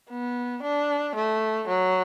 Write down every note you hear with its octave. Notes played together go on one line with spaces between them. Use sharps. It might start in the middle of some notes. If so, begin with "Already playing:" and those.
B3
D4
A3
F#3